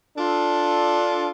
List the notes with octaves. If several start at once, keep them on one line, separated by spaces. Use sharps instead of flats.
D4 F4 A4